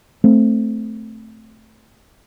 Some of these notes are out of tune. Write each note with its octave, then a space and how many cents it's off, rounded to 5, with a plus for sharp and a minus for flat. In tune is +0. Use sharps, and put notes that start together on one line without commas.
A3 +0 C4 +0